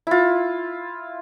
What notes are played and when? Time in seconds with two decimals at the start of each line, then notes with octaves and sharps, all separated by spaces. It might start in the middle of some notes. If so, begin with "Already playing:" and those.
0.07 E4 F4